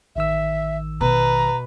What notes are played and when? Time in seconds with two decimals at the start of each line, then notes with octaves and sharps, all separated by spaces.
0.16 A1 D#3 E5 E6
1.01 B2 B4 A#5